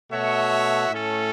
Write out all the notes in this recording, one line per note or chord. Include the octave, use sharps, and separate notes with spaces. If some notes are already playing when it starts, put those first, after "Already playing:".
B2 A3 F#4 C#5 E5
A2 A3 C#4 A4